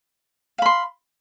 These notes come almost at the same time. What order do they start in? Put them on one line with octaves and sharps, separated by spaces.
F5 B5 C6